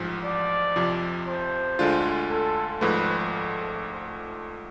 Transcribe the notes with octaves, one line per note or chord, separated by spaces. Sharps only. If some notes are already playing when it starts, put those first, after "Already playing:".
Already playing: A1 G#2 F3
D5
F2 C3 F3
C5
D2 D3 G#3 D4 F4
A4
G#1 G#2 F3 A3 B4